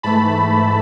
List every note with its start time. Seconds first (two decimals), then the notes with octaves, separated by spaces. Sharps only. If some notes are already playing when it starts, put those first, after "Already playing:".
0.03 G#2 E3 A3 A5 B5
0.52 G#2 E3 A3